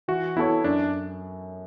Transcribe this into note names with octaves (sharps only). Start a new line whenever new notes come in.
E3 F#4
B3 E4 F#4 A4 C#5
F#2 D4